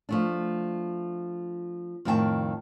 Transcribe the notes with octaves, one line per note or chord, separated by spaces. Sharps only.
F3 A3 D4
F2 A2 D#3 A4 G5 A5